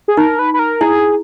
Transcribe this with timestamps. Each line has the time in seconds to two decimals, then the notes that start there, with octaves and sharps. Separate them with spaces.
0.08 G#4
0.17 D#4 A#4
0.39 B4
0.54 B4
0.59 A#4
0.81 E4 G#4